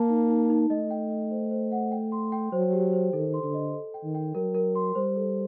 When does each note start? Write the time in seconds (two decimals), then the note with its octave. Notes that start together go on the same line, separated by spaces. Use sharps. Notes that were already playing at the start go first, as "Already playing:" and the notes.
Already playing: A#3 A5
0.10 D#4
0.30 D#4
0.50 D#4
0.70 A3 D#5
0.91 G5
1.10 D#5
1.31 C5
1.51 C5
1.72 F#5
1.92 G5
2.12 C6
2.32 G5
2.52 F#3 C5
2.73 G4
2.93 C5
3.13 D#3 A4
3.34 C6
3.43 D3
3.54 D#5
3.74 A4
3.94 G5
4.04 D#3
4.15 G5
4.35 F#3 A#4
4.54 A#4
4.75 C6
4.95 G3 C5
5.16 A4